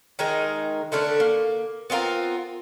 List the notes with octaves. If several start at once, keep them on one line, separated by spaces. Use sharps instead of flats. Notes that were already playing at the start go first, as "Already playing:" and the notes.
D#3 G#3 D#4 A#4
D3 A3 C#4 D4
A#3
B3 C4 F4 A#4